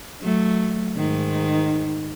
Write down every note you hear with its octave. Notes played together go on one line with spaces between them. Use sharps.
F#3 A3
G#2 D#3